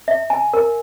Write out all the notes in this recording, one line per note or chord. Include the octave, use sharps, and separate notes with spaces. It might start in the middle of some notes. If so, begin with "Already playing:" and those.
E5
G#5
A#4